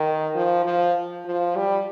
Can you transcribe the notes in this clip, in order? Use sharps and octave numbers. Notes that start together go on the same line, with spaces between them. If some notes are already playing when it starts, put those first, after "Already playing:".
Already playing: D#3
F3
F3
F3
G3